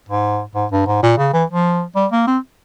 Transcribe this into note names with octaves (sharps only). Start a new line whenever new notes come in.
G#2
G#2
G2
G#2
A#2
C#3
E3
F3
G3
A#3
C4